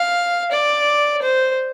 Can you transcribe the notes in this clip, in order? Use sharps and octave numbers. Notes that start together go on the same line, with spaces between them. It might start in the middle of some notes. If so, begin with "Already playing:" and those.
Already playing: F5
D5
C5